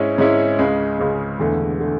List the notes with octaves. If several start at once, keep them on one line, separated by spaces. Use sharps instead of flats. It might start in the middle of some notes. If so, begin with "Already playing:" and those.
Already playing: G#2 G#3 C#4 E4
G#2 G#3 C#4 E4
C#2 C#3 G#3
C#2 C#3 G#3
E1 E2 D3 A3
D3 A3